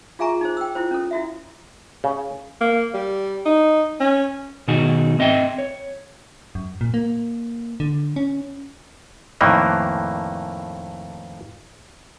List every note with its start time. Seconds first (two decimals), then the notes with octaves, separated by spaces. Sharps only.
0.19 F4 G#4 E5 G#5 A#5 C#6
0.41 D#4 G#4 C5
0.57 G5 E6
0.75 E4 F4 C5
0.91 C#4 A4
1.11 E4 F#4 E5
2.04 C#3
2.61 A#3
2.94 G3
3.46 D#4
4.00 C#4
4.68 B2 D#3 D#4 F#4 G#4
5.19 C4 D#5 E5 G5
5.58 C#5
6.55 F#2
6.81 A#2
6.94 A#3
7.80 D3
8.16 C#4
9.41 F2 A2 D#3 E3 A#3